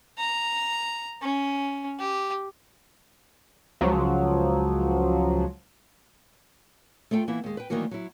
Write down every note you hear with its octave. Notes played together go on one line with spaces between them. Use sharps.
A#5
C#4
G4
C#2 F3 F#3
A3 F4 A4 G5
E3 A#3 B3 E4
D#2 G#3
B4 G5
D2 D#3 E3 F#3 A#3 F#4
F#3 E4